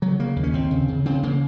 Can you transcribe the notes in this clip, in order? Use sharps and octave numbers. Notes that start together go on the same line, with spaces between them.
C#3 F#3
C#3 A#3
D#2
C#4
D#2 C4
C#3
C#3
C#3 C4
C#3 A#3